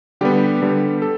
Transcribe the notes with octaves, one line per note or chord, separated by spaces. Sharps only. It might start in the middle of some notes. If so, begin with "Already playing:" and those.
D3 G3 B3 G4
D3 G3 B3
A4